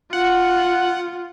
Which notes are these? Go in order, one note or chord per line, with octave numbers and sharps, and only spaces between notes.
F4 F#5